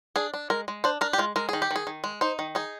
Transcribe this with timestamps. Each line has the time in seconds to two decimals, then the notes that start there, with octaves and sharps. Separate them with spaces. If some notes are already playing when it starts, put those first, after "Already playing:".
0.16 D4 G#4
0.34 D4
0.50 G#3 A#4
0.68 G#3
0.84 D4 C5
1.01 D4 A#4
1.13 G4
1.18 G#3 F4
1.36 G#3 A#4
1.49 D#3 G#4
1.62 G4
1.71 D#3 G#4
1.87 D#3
2.04 G#3
2.21 D#4 C5
2.39 D#3
2.55 D#4 G#4